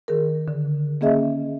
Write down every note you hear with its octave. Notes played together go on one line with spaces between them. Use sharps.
D#3 G#4 A#4
D3
A#3 C#4 G#4 D#5 E5